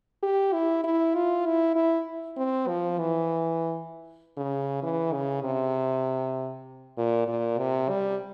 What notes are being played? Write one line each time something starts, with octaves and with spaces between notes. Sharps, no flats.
G4
E4
E4
F4
E4
E4
C4
F3
E3
C#3
E3
C#3
C3
A#2
A#2
C3
G3